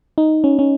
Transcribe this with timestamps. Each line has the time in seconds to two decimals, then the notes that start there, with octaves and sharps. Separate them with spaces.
0.18 D#4
0.44 C#4
0.59 C#4